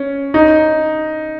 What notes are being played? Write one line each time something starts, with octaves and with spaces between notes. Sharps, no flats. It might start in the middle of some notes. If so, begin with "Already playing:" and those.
Already playing: C#4
D#4